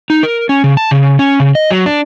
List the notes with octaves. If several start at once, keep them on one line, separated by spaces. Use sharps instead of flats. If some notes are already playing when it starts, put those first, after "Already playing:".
D#4
A#4
C#4
C#3
A5
C#3
C#4
C#3
D#5
F#3
D4